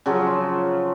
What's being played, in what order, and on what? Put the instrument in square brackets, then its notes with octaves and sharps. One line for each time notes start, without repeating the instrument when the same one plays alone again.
[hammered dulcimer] C#3 F3 F#3 F4